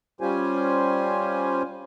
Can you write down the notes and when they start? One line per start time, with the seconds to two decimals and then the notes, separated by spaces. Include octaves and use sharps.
0.21 G3 C#4 F4 G4 C5 G#5